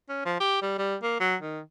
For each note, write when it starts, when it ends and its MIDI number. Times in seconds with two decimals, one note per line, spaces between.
0.09 0.23 61
0.25 0.36 53
0.40 0.61 67
0.62 0.76 55
0.78 0.96 55
1.03 1.19 58
1.20 1.35 54
1.42 1.60 51